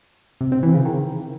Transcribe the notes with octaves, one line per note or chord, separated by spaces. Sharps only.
C3
C4
E3
C#3
D#3